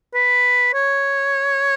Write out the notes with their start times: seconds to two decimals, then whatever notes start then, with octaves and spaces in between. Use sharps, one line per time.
0.14 B4
0.74 C#5